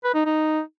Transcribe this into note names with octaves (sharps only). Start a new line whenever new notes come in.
B4
D#4
D#4